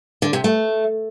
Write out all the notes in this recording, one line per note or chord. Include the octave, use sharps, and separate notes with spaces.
D3
C3
A3